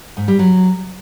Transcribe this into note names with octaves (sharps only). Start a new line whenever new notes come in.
G#2
G3
F#3